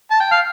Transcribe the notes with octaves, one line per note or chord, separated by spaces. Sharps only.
A5
G5
F5